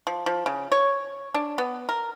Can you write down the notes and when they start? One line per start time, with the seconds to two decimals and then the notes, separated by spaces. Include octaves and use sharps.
0.07 F3
0.26 F3
0.46 C#3
0.72 C#5
1.34 D4
1.58 B3
1.89 A#4